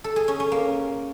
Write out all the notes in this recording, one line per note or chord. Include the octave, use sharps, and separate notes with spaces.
A4
G#4
C#4
C#4
A#3